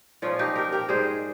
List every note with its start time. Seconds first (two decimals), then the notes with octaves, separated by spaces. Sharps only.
0.22 A#2 F3 G#3 C#4 F4
0.39 D#4 G4
0.56 G4 A#4
0.72 G4 A#4
0.89 G#2 G3 G#4 C5